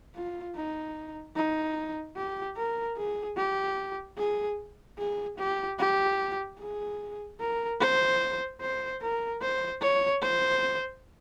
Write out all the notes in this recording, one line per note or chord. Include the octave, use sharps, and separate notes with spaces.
F4
D#4
D#4
G4
A#4
G#4
G4
G#4
G#4
G4
G4
G#4
A#4
C5
C5
A#4
C5
C#5
C5